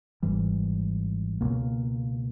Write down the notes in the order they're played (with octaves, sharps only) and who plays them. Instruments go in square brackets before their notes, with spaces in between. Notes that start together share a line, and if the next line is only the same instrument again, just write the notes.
[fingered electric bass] G#1 G#2 E3 G3
C#2 B2 A#3